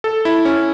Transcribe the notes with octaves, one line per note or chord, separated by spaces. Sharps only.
A4
E4
C#4